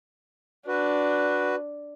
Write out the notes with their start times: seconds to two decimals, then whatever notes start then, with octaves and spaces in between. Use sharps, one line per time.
0.68 D4 F#4 B4